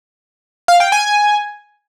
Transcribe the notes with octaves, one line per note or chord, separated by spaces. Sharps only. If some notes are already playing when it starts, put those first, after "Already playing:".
F5
G5
G#5